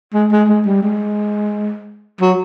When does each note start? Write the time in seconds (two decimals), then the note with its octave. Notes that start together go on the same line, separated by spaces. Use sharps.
0.14 G#3
0.31 G#3
0.49 G#3
0.66 G3
0.82 G#3
2.21 F#3